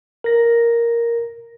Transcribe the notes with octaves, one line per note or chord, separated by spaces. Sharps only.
A#4 A#6